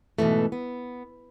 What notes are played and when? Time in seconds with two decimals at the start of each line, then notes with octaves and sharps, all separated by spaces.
0.18 G#2 B2 D#3 E3 A3
0.52 B3